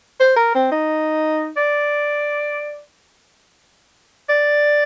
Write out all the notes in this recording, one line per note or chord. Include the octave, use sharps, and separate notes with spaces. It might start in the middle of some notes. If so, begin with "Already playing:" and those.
C5
A#4
C4
D#4
D5
D5